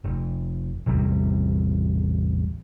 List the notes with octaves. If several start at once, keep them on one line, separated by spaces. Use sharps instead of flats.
F1
A1 E2 C3 G3